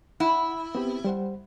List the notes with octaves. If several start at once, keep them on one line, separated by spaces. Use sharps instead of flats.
E4 F#5
B3 C4 G4
G3 C5 F#5